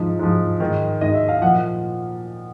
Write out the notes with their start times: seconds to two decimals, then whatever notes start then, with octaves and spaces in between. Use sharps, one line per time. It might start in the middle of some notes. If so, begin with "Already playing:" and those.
Already playing: G#2 F3
0.19 G#2 F3
0.60 G#2 D#3
1.01 G#2 D#3 D#5
1.14 E5
1.28 F5
1.41 A#2 F3 F#5